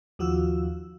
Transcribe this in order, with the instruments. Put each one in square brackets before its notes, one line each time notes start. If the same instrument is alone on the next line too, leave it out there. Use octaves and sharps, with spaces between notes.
[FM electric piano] D#2 F3 F4 F#4 E6